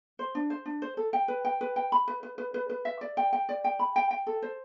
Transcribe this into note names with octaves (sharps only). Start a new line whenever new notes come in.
C5
D4
C5
D4
C5
A4
G5
B4
G5
B4
G5
B5
B4
B4
B4
B4
B4
E5
D5
G5
G5
D5
G5
B5
G5
G5
A4
C5